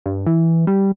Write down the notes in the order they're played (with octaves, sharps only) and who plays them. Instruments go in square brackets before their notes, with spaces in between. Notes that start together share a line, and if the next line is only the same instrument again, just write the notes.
[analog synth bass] G2
E3
G3